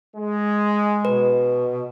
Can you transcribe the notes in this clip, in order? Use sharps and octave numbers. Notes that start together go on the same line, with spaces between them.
G#3
B2 B4